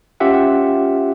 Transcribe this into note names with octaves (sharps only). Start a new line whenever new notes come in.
C#4 F4 G4 E5 F#5